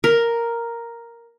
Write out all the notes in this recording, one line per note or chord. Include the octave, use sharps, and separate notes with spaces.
A#4